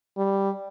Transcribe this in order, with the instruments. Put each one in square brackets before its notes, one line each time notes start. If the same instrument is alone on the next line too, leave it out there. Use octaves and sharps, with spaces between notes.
[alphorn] G3